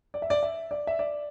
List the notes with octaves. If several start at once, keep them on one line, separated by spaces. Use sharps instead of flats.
D5
E5
D5
E5
D5
E5
D5